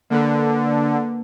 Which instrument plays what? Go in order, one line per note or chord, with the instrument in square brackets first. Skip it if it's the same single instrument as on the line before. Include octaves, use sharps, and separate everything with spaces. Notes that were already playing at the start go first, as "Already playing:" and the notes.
[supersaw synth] D3 [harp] A#3 D4 B4